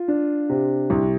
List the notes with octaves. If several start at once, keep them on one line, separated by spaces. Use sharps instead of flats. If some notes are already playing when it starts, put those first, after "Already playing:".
Already playing: F4
D4
C3
C2